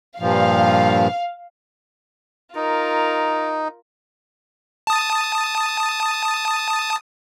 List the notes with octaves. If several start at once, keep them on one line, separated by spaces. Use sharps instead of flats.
G2 A#2 F3 F5
D#4 F4 A#4
A5 D#6